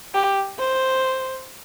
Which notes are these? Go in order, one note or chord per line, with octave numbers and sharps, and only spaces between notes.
G4
C5